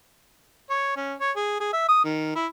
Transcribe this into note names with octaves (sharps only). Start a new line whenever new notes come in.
C#5
C#4
C#5
G#4
G#4
E5
D#6
D#3
E4